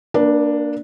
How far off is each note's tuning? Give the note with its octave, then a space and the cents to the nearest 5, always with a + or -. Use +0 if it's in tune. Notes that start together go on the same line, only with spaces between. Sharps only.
A#3 +0 D4 +0 B4 -45